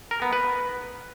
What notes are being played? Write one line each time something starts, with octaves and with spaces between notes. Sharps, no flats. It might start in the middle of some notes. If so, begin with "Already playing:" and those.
A#4
B3
B4